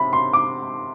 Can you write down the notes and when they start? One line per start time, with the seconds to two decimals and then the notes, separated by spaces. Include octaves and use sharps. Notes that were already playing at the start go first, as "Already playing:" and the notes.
Already playing: C3 B5
0.13 C6
0.33 D6